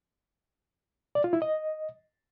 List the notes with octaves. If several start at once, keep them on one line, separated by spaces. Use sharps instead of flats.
D5
F4
E4
D#5